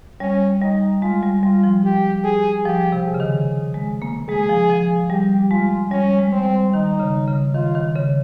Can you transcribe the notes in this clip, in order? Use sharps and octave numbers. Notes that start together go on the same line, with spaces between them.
G3 C#4
G3 D#4
G#3 F4
G3
G3 F4
F3
G4
G#4
F3 G4
C3
G#4
C#3
D#3
G#3
A#3
G#3 G#4
F3
F3
G3 G4
G#3 F4
G3 C#4
G#3
C4
G3
D#3 D#4
C#3
C#3
D#3 F4
D#3
C#3